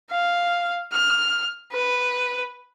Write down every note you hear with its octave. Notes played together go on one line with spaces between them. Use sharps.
F5
F6
B4